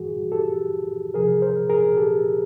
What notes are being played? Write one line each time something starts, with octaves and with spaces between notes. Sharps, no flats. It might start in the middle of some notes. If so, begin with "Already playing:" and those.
Already playing: G2 E3 G3 F#4 G#4
G4 A4
E2 C3 F3 G#4 A#4
A#4 C5
G#4 A#4
G4 A4